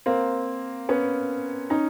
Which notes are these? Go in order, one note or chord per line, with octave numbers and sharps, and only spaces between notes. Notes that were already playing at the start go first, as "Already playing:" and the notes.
A#3 C4
B3 C#4
C#4 D#4